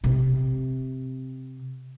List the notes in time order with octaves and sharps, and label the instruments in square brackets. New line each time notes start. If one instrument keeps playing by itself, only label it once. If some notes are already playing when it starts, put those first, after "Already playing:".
[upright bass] C3 C4